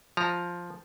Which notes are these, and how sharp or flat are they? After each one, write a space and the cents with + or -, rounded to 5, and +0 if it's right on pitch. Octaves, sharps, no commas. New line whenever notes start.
F3 +0 A#5 +0